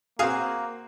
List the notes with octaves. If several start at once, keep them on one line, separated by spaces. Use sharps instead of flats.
A#3 C4 F#4 G#4 F5 D#6